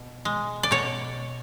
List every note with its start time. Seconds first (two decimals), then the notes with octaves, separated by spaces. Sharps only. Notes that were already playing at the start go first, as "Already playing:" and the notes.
Already playing: B2
0.25 G#3
0.63 D5
0.71 B2 C#5